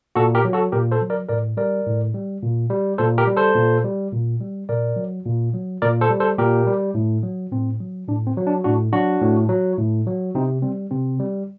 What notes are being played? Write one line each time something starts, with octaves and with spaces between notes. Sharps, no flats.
A#2 F#4 A4
G4 A#4
F#3
F#4 A4
A#2 G4 A#4
A4 C5
F#3
A#4 D5
A2 A#4 D5
G3 A#4 D5
A2
G3
A#2
G3
A#2 A4 C5
G4 A#4
G3
A4 C5
A#2
G3
A#2
G3
A#2 A#4 D5
F#3
A#2
F#3
A#2 A#4 D5
A4 C5
G3
A4 C5
A#2 G4 A#4
G3
A2
F#3
A2 C4
F#3
A2 D4
C4
F#3
D4
A2 D4 F#4
F#3 D4 F#4
A2
F#3
A2
F#3
C3 C4 D#4
G3 C4
C3 C4
G3